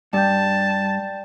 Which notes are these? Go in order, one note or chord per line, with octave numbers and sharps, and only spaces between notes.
G2 D5 G5 A5 G6